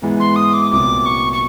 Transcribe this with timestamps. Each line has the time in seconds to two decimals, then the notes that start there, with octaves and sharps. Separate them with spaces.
0.02 G#2 E3 G#3 B3
0.20 C6
0.36 D#6
0.53 D6
0.71 C2 A#2 F#3 B3 D6
1.06 C#6
1.33 C#6